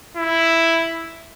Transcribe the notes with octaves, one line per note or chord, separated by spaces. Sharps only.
E4